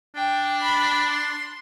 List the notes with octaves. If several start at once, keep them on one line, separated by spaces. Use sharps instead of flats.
D4 G5
B5
C6